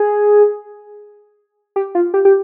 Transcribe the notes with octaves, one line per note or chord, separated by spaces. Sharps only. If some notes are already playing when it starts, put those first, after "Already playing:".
Already playing: G#4
G4
F4
G4
G4